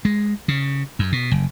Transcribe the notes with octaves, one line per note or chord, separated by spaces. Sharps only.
G#3
C#3
F#2
B2
F#1